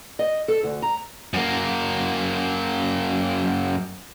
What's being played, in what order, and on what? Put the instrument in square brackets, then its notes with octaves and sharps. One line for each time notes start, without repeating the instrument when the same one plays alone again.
[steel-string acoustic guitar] D#5
A4
D2
A#5
[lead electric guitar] F#2 A#3